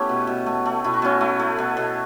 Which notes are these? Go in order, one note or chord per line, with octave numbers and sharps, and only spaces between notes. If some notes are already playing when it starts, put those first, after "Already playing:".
Already playing: A3 B3 C#4 E4 G4
B2
B2
A3
A3
B2 E4
F#4
B2 C#4 E4
A3
A3
B2
B2